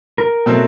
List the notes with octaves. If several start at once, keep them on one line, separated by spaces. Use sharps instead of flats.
A#4
B2 F#3 A3 C4